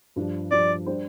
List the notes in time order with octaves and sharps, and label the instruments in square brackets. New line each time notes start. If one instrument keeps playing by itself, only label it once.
[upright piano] G2 F3 D4
[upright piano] G2 F3 D4 [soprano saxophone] D5
[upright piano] G3 D4 G4 C5